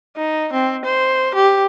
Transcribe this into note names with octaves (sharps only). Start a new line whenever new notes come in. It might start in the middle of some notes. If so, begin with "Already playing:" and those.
D#4
C4
C5
G4